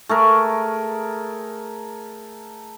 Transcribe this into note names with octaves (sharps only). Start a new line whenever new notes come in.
A3 G#4 A#4